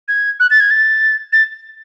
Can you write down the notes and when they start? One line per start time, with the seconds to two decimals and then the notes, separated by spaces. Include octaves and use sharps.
0.08 G#6
0.40 F#6
0.51 A6
0.60 G#6
0.71 A6
1.33 A6